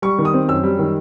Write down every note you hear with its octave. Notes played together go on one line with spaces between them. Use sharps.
G3 C#6
D#3
D#6
C4
F#2 E6
G3
D#3